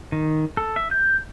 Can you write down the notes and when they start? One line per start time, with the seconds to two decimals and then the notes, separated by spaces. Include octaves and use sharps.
0.12 D#3
0.57 A4
0.76 E5
0.91 G6